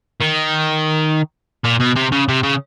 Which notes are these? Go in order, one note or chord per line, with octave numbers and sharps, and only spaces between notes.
D#3
A#2
B2
C3
C#3
C3
C#3